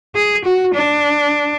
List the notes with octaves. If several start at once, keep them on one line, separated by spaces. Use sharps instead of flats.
G#4
F#4
D4